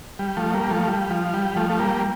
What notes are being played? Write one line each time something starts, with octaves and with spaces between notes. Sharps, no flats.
G3
F3 A3
G3 A#3
F3 A3
G3
F3
G3
F3 A3
A3
G3 A#3